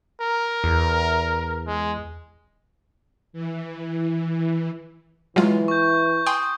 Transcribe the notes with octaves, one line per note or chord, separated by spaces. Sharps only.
A#4
E2
G#3
E3
E3 F#3 G#3 F4
C#6 G6
G5 G#5 C6 D#6